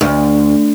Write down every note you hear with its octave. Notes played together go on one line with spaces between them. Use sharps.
D2